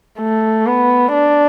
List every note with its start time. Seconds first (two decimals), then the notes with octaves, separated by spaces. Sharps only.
0.19 A3
0.66 B3
1.13 D4